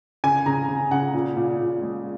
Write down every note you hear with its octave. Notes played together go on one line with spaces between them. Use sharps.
C#3 G#5
C#3 A#5
C#3
C#3 F#5
A#2
A#2
A#2
G#3